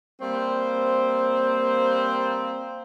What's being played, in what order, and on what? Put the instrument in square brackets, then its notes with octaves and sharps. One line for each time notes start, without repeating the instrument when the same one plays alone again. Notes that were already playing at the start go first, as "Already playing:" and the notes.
[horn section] G3 A#3 C4 C5